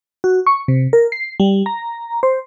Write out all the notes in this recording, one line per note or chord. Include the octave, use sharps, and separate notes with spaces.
F#4
C#6
C3
A#4
C7
G3
A#5
C5